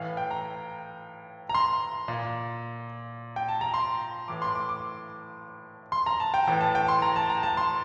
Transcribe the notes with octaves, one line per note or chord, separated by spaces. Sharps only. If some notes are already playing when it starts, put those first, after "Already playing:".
Already playing: A2 E3 F5
G5
A#5
A#5
C6
A#2
G5
A5
A#5
C6
A2 E3 D6
C6
D6
D6
C6
A#5
A5
G5
A2 E3 G5
A5
G5
C6
A#5
A5
A#5
A5
C6